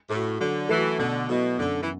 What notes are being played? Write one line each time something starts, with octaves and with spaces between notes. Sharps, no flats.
A2 A3 F#4
D3 F#3
E3 A3 F#4
B2 D3
B2 F#3 B3 E4 A4
F#2 D3
E3